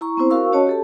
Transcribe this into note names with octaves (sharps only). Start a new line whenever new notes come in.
E4 A#5 C#6
B3 C4 E4 C5
F#4 A#4 F5 C#6 E6
C#4 F#4 C#5 D#5 A5
G4 A4 A5